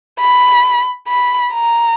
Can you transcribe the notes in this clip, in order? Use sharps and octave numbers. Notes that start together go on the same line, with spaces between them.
B5
B5
A#5